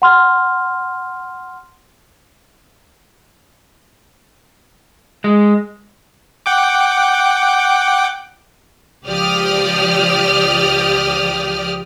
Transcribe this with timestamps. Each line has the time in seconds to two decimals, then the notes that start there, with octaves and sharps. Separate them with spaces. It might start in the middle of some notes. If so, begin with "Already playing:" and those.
0.02 F#5 C6 F6
5.24 G#3
6.46 F#5 G5 D6
9.05 C#2 F3 G4 D5 D#6 F6